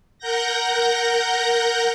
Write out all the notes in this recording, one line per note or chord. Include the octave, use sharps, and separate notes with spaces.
A#4 F#5 G6 A#6